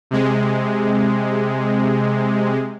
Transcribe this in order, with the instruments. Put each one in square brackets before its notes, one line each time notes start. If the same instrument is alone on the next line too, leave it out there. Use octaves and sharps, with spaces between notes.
[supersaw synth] C3 G#3